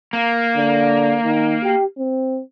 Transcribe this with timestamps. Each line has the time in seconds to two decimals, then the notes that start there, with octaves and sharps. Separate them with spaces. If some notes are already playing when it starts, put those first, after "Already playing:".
0.13 A#3
0.56 D3
1.24 D#3
1.63 G4
1.98 C4